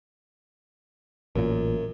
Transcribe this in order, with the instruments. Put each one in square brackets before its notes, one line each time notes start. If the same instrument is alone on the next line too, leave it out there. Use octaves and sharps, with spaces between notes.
[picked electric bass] A1 A#2 [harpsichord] F#2